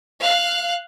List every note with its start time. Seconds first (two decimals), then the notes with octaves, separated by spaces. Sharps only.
0.21 F5 F#6